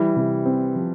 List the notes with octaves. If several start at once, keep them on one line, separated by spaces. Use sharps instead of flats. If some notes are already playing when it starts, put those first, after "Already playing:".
Already playing: E3 G3 E4
C3
C4
F3